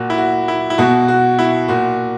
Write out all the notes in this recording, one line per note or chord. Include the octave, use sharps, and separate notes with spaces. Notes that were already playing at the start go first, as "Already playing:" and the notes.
Already playing: A#2 F#4
E4
F#4
E4
E4
B2 F#4
F#4
E4
A#2 F#4